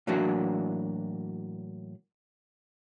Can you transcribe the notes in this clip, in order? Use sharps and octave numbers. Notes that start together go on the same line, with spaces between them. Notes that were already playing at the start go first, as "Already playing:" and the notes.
A2 E3 F#3 A#3 D4 F#4